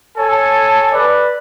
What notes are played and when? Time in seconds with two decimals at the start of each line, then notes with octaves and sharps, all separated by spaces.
0.17 A4 C#5 G#5 A5
0.92 B4 D5